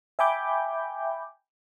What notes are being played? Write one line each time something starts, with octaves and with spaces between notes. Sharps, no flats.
E5 G5 G#5 B5 D6 G6